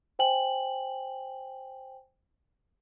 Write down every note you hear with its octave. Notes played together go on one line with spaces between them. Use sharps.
C5 G5 G#5 F#7